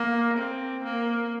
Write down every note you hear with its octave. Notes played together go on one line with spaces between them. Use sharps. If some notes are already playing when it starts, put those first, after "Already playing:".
Already playing: A#3
C4
A#3